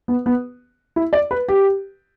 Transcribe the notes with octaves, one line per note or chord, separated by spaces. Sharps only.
B3
B3
E4
D5
B4
G4